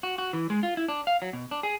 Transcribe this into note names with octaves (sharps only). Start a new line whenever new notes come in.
F#4
F#4
E3
G#3
F4
E4
D4
F5
F#3
B2
D4
G#4